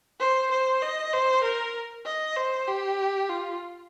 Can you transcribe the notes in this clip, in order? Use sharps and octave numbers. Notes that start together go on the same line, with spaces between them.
C5
C5
D#5
C5
A#4
D#5
C5
G4
F4